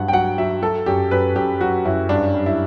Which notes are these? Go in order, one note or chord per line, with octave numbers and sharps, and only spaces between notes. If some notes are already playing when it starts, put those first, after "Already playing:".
Already playing: G2 F#3 F#5
G5
F#3 F#5
F#3 E5
F#3 A4
F#2 G4
F#2 B4
F#2 G4
F#3 F#4
F#2 E4
G2 D4
G3
E4